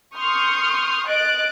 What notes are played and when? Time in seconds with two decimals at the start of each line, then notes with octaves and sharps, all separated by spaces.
0.17 C6 C#6 D#6 F6 G6
1.09 D#5 F#6 A6 D7